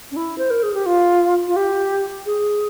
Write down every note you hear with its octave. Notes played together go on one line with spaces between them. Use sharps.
C#4
E4
C5
A#4
G#4
G4
F4
F4
G4
G#4